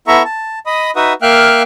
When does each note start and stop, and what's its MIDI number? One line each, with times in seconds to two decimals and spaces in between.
0.08 0.23 59
0.08 0.23 64
0.08 0.23 69
0.08 0.23 76
0.08 0.23 82
0.08 0.23 85
0.25 0.59 81
0.66 0.91 75
0.66 0.91 83
0.66 0.91 87
0.96 1.13 63
0.96 1.13 66
0.96 1.13 71
0.96 1.13 76
0.96 1.13 78
0.96 1.13 87
1.22 1.63 58
1.22 1.63 76
1.22 1.63 77
1.22 1.63 79
1.22 1.63 89
1.22 1.63 90